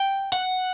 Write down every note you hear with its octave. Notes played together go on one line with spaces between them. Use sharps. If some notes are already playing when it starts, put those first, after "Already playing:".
Already playing: G5
F#5